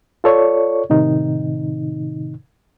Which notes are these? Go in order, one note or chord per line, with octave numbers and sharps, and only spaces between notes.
F4 A4 C#5 D5 C#6
A2 C3 D#3 D#4